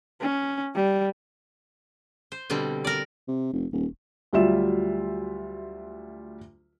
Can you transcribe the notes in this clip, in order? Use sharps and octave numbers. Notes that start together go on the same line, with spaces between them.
C#4
G3
C5
B2 D3 G3 C4
A#4 D5
C3
F1
D#1
D2 F#3 G3 F4 E5 E7